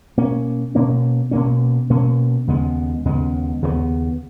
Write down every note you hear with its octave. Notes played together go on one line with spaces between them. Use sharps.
B2 A#3 C#4
B2 A#3 C#4
B2 A#3 C#4
B2 A#3 C#4
D#2 C#3 G#3 B3
D#2 C#3 G#3 B3
D#2 C#3 G#3 B3